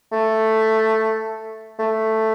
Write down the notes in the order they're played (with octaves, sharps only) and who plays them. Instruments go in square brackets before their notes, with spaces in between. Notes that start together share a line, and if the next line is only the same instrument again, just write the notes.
[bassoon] A3
A3